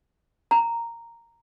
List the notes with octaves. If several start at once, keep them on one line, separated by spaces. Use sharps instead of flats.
A#5